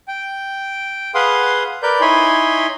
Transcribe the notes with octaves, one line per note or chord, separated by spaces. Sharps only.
G5
G#4 B4 F5 F#5 C6 D#6
A#4 B4 D5 G6
D#4 E4 C#5 G#5 B5 C6